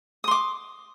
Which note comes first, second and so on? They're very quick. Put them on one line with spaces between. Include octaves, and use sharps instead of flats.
D#6 C6 D6